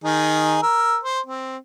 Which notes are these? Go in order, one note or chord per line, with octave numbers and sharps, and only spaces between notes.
D#3 D#4 G#4
A#4 E6
C5
C4